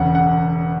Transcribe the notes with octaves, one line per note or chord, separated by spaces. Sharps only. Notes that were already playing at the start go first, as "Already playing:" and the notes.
Already playing: E1 E2 C#3 F#5
F#5